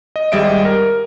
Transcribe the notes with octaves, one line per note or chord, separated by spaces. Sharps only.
D#5
G#1 G3 G#4 D#5 E5 D7
A#4